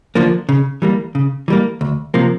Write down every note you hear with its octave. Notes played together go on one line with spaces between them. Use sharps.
D3 F3 A#3 D4
C#3
E3 G3 A#3
C#3
E3 G3 A#3
D2
C3 F3 A#3